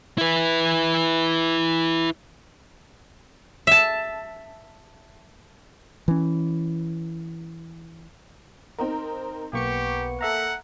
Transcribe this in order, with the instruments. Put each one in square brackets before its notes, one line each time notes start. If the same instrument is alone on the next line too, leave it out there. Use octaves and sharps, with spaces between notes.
[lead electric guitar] E4 B4
[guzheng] E5 A5
[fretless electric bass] E3 C#4
[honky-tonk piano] C4 D#4 A#4
[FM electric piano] B1 C#6 C#7 [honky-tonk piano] A#3 [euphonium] B3 [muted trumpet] G4
[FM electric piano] A4 E5 A#5 [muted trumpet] F#5